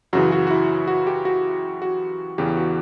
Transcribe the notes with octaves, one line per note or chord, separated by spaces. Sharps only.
F#2 C#3 E3 F#4
F#4
F#4
E4
F#4
G4
F#4
F#4
E2 C#3 E3 G4
F#4